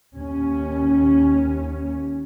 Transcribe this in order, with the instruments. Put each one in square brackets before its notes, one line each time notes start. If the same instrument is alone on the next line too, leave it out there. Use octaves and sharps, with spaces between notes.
[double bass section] D#2 C#4